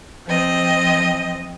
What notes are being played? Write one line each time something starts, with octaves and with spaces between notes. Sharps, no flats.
F3 C4 D#5